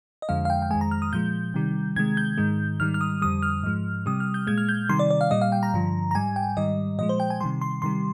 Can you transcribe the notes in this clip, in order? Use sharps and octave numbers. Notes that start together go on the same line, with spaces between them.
D#5
F2 D3 F3 G#3 F5
F5
G5
G5
F2 D#3 G#3 G#5
A#5
F6
D#6
A#2 F3 G#3 G6
C3 D#3 G3
C3 D#3 G#3 G#6
G6
G#2 D#3 G#3
G#2 D#3 G3 F6
F6
D#6
F2 D3 G3 D#6
F6
G#2 F3 G#3
C3 G3 D#6
F6
G6
A#2 G#3 G#6
F6
G6
C3 D#3 G3 C6
D5
D5
F5
A#2 G3 D#5
F5
G5
A#5
G2 D3 F3
A#5
G#2 G3 G#5
G5
G#2 D#3 G3 D#5
A#2 F3 G#3 D#5
C5
G5
G#5
C3 D#3 G3 C6
C6
C3 D#3 G3 C6